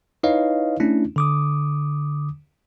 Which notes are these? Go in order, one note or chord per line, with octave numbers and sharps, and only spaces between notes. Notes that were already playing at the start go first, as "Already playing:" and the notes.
D#4 E4 B4 C#5 D#5 F5
A3 C#4 D4 E4
D3 D6 D#6